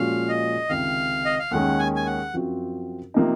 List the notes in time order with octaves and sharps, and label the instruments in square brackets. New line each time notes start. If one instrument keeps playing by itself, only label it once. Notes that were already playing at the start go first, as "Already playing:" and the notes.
Already playing: [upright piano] A#2 F3 G#3 C#4 F#4 [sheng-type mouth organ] F5
[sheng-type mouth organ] D#5
[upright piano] C#2 C3 D#3 [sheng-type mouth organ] F5
[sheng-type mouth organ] D#5
F5
[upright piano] D#2 D#3 G#3 C#4 [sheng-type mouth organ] F#5
[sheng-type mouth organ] G#5
G#5
F#5
[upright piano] F#2 F3 C4 F#4
C3 F3 A#3 D#4